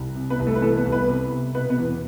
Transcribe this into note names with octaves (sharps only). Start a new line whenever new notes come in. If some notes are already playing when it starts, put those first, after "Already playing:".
Already playing: C2
C3
B3 B4
C2
A3 A4
B4
E3 A3 A4
B3 B4
C2
B3 B4
C3
C3
B2 B3 B4
B3 B4
E2